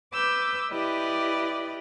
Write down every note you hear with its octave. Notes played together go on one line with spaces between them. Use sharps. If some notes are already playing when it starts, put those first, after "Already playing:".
B4 D6 E6 G6
E4 G4 B4 D5 D#5